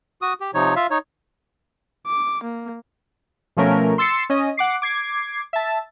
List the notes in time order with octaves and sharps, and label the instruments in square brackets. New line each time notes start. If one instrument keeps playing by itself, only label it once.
[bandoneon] F#4 D#6
G4
C3 F3 D#4 C#5
F4 E5 F5
D#4 C#5
[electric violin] D6
A#3
[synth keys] B2 F3 A3 C#4 A#4
C6 E6 A6 C7 C#7
C#4 D#5
F#5 D6 C7
D6 G#6 C7
E5 A5